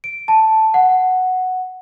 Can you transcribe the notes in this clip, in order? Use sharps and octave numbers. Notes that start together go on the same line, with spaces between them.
D7
A5
F#5